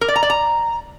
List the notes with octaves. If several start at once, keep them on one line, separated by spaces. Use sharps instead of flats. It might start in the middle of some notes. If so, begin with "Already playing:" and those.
A#4
D5
A#5
D5
A#5